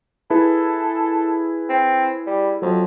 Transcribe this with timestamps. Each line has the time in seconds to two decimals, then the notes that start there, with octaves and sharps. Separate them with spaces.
0.30 E4 G#4 A4 B4
1.69 C4
2.27 G3
2.62 F2 F#3